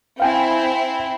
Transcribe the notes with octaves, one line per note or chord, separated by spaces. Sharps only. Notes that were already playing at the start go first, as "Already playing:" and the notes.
C4 E4 F5 G5 G#5